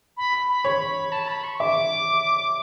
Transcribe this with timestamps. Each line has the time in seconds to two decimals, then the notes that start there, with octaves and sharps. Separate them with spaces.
0.17 B5
0.48 B5
0.65 C#5 B5
1.12 A5
1.28 B5
1.44 C#6
1.60 E5 D6